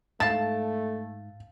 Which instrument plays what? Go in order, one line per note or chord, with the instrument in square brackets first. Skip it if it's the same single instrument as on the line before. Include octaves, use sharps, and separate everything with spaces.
[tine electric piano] G#2 [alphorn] A3 [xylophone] F5 A5 [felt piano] A6